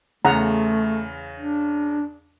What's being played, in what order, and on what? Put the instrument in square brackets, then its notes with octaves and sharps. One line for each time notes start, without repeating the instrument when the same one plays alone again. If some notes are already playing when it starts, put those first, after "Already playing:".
[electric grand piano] E2 C#3 [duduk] A3 [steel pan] F#5 A#5
[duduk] D4